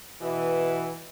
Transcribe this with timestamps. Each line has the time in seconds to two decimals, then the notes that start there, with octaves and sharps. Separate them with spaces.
0.21 B2 E3